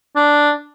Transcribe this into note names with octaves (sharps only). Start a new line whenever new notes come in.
D4